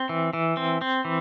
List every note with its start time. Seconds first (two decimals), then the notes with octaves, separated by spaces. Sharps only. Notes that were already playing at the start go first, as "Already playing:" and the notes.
Already playing: C4
0.09 E3
0.33 E3
0.57 C4
0.81 C4
1.05 E3